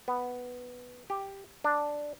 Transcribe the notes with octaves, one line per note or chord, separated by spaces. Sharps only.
B3
G4
D4